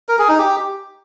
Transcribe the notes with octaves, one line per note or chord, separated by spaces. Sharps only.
A#4
G#4
D#4
G4